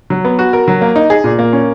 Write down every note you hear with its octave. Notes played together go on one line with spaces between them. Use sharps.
F#3
B3
F#4
A#4
F#3
A#3
D#4
G#4
A#2
A#3
C#4